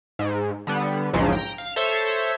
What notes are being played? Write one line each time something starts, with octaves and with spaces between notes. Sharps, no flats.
G#2
D3 G3 B3
A#1 E2 G#2 C#3 F3 F#3
G5 A#5
F5
A4 C5 C#5 E5